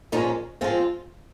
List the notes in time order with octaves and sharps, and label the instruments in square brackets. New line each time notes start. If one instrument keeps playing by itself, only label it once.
[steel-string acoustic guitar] A#2 F3 G#3 C#4 D#4
F3 G#3 C4 F4